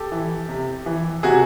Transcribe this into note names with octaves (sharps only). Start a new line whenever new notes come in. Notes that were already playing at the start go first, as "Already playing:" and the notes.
Already playing: G4 A4
E3
C3
E3
C3 F#4 G#4